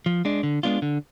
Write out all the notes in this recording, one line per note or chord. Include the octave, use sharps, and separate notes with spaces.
F3
G#3 D4
D3
G#3 B3 D4 F4
D3